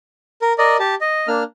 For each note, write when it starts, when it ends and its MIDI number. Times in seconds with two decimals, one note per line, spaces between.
0.42 0.53 70
0.58 0.77 70
0.58 0.77 74
0.58 0.77 75
0.79 0.95 67
0.79 0.95 81
1.01 1.27 75
1.28 1.43 58
1.28 1.43 62
1.28 1.43 89